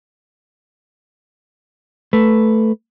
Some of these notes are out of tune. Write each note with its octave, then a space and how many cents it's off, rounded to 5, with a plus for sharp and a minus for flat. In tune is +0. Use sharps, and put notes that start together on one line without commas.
A3 +0 B4 +5